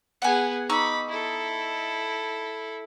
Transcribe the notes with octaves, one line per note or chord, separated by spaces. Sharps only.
B3 G#4 F#5 G#5
D#4 B5 C#6 D6 E6
E4 A4